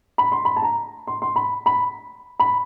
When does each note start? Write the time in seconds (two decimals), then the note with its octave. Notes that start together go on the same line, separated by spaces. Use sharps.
0.18 B5
0.32 C6
0.45 B5
0.56 A5
0.62 A#5
1.07 C6
1.22 C6
1.36 B5
1.66 B5
2.40 B5